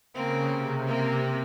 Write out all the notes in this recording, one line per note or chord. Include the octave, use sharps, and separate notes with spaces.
C#3 A#3 C4
C3
C3 A#3 C4